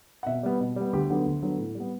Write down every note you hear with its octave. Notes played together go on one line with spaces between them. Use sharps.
F#5
B2 E5
G3 B3
B2
G3 B3
D2 G4
D3 F#3 B3
D2
D3 F#3 B3
A2
G3
B3